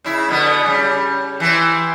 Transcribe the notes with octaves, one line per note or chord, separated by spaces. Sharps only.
C#3 E4
B2 D3 B3
C#3 G3
E3 C4